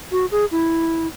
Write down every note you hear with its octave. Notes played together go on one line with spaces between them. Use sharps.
F#4
G#4
E4